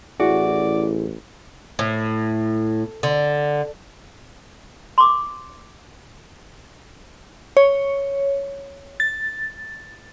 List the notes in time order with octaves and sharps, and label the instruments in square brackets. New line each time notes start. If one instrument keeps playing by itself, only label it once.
[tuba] A1 [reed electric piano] E4 G#4 [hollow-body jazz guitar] F#4 [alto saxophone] D5
[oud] A2
D3
[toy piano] C6 D6
[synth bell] C#5
A6